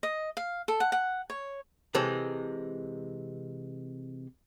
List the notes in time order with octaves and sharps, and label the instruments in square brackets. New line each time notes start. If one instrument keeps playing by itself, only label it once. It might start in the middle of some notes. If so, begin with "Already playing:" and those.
[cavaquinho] D#5
F5
A4
F#5
F#5
C#5
[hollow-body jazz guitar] C3 E3 G#3 A4